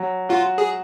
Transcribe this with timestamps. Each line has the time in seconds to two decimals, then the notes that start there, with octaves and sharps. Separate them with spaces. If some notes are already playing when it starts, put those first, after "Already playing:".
Already playing: F#3
0.29 F4 F#4
0.58 G#4